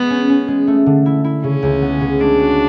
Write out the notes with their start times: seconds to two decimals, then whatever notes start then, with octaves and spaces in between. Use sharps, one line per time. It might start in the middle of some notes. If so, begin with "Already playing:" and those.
Already playing: G#3 B3
0.10 C#4
0.29 C#4
0.48 G#3
0.67 A3
0.86 D3
1.06 E4
1.24 E4
1.44 C#3 C#4
1.62 C#2
1.82 B3
2.01 C#3
2.20 G#3 D4
2.39 F#4